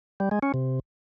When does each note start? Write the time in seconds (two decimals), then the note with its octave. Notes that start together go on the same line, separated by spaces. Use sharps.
0.20 G3
0.31 G#3
0.43 C#4
0.54 C3